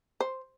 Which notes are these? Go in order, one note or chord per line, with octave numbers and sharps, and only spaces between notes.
C5